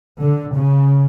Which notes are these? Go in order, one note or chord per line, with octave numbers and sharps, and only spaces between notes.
D3
C#3